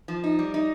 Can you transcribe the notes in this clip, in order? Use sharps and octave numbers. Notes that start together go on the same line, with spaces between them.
F3
D#4
G3
D#4